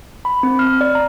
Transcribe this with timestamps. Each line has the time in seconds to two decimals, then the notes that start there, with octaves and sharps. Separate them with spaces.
0.25 B5
0.43 C4
0.59 F6
0.81 D5
0.95 A#5